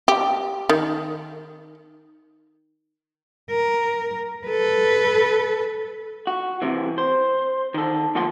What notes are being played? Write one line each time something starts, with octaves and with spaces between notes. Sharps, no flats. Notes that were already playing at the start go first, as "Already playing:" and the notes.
G4
D#3
A#4
A4 B4
F#4
C3 E3
C5
D#3 A4
D2 F3 A#3 F#5 A5 C6